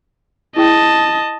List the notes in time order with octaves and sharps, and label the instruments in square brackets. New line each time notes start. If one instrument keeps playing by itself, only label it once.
[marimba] E4 G#4 G5 [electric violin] D#5 A5